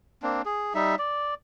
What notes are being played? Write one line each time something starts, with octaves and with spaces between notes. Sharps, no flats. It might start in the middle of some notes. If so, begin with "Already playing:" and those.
A#3 C4 D4
G#4
G3 D#4 E5
D5